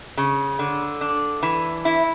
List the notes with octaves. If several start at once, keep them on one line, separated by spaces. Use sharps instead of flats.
C#3
D3
D4
E3
E4